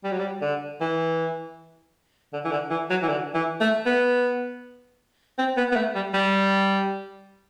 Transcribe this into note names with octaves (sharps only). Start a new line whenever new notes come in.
G3
F#3
G3
D3
E3
D3
E3
D3
E3
F#3
E3
D3
E3
A3
B3
C4
B3
B3
A3
G3
G3